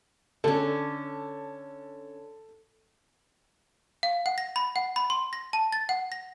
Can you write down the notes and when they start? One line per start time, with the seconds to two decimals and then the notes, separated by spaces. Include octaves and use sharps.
0.44 D3 C#4 A4
4.03 F5
4.26 F#5
4.38 A#6
4.56 B5
4.76 F#5
4.96 B5
5.10 C6
5.33 A#6
5.53 A5
5.72 A6
5.89 F#5
6.12 A#6